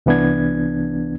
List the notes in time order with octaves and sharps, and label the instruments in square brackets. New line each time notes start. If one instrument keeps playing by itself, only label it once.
[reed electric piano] C2 E3 B3 D4 G#6